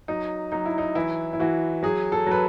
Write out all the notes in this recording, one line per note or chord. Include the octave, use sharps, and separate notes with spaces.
F#3 D#4
F#3 D#4
E4
D#4
E3 E4
E4
E3 F#4
F#3 G#4
A4
F#3 B4